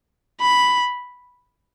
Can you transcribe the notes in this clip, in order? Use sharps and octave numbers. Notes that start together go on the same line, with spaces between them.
B5